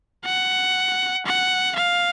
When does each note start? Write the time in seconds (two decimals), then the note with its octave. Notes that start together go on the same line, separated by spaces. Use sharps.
0.25 F#5
1.26 F#5
1.76 F5